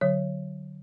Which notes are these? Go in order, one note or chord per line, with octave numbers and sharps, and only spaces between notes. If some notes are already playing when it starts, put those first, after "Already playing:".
D3 F#3 C#5